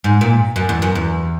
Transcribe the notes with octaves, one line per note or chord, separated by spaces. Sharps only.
G#2
A#2
F#2
E2
F#2
E2